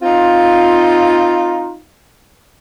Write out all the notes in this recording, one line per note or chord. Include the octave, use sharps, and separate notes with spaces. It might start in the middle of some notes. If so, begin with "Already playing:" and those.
C4 D#4 F4